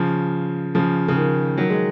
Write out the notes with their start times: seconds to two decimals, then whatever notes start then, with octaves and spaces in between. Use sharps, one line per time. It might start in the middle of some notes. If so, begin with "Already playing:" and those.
Already playing: C#3 F3
0.75 C#3 F3
1.08 C#3
1.16 D#3
1.58 D#3 F#3
1.70 G#3